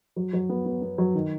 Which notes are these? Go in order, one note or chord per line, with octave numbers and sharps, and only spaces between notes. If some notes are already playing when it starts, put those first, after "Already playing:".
F#3
F#3
B3
B3
B3
F#3
D#3